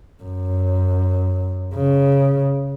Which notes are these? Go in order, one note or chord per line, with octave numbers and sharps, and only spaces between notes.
F#2
C#3